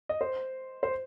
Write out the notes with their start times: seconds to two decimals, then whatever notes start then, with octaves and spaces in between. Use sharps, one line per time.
0.09 D#5
0.21 C5
0.83 C5